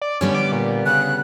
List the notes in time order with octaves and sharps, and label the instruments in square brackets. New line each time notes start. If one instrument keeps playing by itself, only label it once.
[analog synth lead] D5
[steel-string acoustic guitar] D3 G3 B3 [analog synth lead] C#4
[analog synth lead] D6
A#2
[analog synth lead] C#3 [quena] F#6